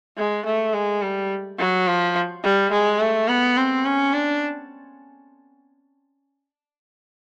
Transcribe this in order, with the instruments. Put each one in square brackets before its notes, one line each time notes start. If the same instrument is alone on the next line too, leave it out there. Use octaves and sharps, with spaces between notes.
[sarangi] G#3
A3
G#3
G3
F#3
F3
G3
G#3
A3
B3
C4
C#4
D4